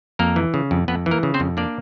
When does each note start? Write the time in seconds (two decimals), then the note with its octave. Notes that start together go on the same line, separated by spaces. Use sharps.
0.19 F2 A#3 A#4
0.36 E3
0.54 C#3
0.71 F2
0.88 F2 B3 B4
1.06 E3
1.11 A#3 A#4
1.23 C#3
1.34 C4 C5
1.40 F2
1.57 A#3 D4 D5